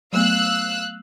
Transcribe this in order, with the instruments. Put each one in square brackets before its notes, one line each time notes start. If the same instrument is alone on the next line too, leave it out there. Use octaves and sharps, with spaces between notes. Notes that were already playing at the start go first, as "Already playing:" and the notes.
[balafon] F#3 A3 B3 [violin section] F5 E6 F#6